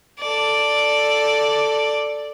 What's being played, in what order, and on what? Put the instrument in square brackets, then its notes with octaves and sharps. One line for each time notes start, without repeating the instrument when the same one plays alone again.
[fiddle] A4 D5